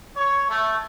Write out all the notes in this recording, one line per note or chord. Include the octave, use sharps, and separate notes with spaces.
C#5
A3